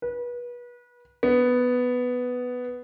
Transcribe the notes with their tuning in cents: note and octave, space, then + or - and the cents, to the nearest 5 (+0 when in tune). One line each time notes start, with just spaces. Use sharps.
B4 -30
B3 +5